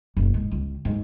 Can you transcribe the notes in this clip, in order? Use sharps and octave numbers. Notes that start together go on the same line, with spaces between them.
F#1 B2
G#2
C#2
G#2 F#3